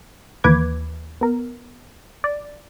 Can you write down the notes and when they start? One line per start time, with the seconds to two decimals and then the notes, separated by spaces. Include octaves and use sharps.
0.44 D#2 E3 A#3 B4 D6 G#6
1.21 B3 A#4
2.24 D5